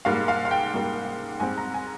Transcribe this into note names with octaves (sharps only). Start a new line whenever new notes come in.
G#2 G3 A#3 F5
F5
F5
G5
G#2 G3 A#3
G#2 G3 C4 G#5
A#5
G#5